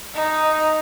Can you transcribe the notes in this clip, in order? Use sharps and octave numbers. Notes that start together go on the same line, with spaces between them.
D#4